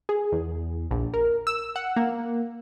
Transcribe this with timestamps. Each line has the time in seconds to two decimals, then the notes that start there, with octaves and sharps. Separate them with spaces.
0.09 G#4
0.32 E2
0.91 A#1
1.14 A#4
1.47 E6
1.76 F#5
1.96 A#3